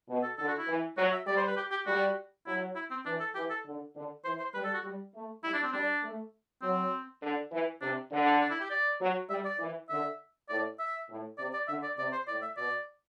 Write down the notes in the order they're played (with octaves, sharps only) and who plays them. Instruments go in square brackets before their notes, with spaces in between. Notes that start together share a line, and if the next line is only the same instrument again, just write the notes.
[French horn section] B2
[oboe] A4
[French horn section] D3 [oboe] A4
[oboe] F#4
E4
[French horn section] E3
[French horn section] F#3 [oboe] F#4
[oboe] E5
[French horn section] G3 [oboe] D5
[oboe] C5
B4
G4
G4
[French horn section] G3 [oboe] F#4
[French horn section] F#3 [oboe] E4
[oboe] E4
C4
[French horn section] E3 [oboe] D4
[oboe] A4
[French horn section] E3 [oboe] G4
[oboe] A4
[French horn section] D3
D3
[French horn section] E3 [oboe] C5
[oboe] C5
[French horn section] G3 [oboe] B4
[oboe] A4
F#4
[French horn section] G3
A3
[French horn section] G3 [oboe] E4
[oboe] D4
C4
[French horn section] G3 [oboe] D4
[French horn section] A3
[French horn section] F#3 [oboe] C4
[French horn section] D3
E3
[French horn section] C3 [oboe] D4
[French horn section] D3
[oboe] D4
D4
E4
G4
D5
[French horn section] F#3
[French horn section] G3 [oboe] E5
[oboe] D5
[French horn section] E3
[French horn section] D3 [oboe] E5
[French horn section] A2 [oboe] D5
[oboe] E5
[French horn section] A2
[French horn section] C3 [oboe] D5
[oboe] D5
[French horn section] D3 [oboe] E5
[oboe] D5
[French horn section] C3 [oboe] D5
[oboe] C5
[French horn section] A2 [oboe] D5
[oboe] E5
[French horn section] B2 [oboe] D5